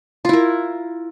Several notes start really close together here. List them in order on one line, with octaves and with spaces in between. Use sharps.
F4 E4 A#4